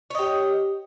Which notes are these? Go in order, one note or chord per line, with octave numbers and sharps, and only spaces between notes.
G4 C#5 D#5